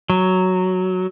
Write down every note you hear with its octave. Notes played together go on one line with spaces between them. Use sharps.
F#3